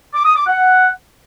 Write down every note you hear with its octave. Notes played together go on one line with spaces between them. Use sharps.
D6
D#6
D6
F#5